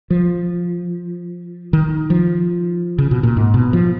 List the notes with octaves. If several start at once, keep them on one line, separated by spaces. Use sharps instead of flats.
F3
D#3
F3
C#3
B2
A#2
G#2
B2
F3